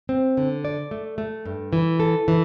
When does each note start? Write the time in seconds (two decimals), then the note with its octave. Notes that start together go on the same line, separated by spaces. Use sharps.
0.09 C4
0.37 D3
0.65 D5
0.91 A3
1.18 A3
1.46 G2
1.73 E3
2.00 A4
2.28 E3